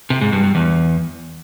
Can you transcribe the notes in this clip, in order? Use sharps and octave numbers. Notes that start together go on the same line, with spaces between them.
C3
G#2
G2
G2
E2